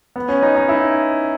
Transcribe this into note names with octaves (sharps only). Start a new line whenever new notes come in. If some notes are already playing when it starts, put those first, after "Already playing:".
B3
C#4
D#4
D#4
E4